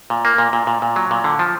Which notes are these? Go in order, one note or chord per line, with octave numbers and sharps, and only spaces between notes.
A#2
A#3
A#2
A#2
A#2
A#2
F#3
A#2
D3
F3